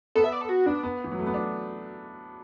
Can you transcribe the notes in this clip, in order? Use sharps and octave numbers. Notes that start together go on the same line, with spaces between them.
B3 A4
E5
D5
A4
F#4
B3 D4
B3
E3
F#3
A3
B3
D4